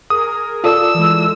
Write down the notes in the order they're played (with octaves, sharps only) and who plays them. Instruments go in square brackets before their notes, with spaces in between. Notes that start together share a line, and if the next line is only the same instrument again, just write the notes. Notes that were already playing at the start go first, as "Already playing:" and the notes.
[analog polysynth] G#4 A#4 [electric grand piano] D#6
[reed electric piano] F4 A4 D5 [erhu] E6
[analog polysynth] E3 G#3